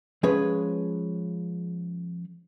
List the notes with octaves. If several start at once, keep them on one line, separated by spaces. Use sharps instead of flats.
F3 G#3 C#4 G#4 B4 C#5